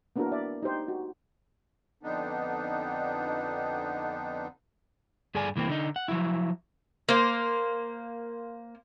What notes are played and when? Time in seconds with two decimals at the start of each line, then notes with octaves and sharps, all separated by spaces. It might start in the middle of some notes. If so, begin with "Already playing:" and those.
0.16 A#3 B3 D4 E4 F#4 A#4
0.32 D5 E5
0.63 D#4 G4 C5 G5
0.88 F#4
2.03 F2 D3 B3 D4 D#4
5.35 G2 G#4 A4 D5 G#5
5.56 C2 E3 A#3 C4
5.69 D3 D#4
5.96 F#5
6.08 F3 F#3 E4
7.09 A#3 C5